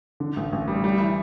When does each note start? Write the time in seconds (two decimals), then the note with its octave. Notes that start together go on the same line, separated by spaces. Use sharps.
0.20 D3
0.37 A1
0.52 A1
0.68 G3
0.84 G3
0.99 E3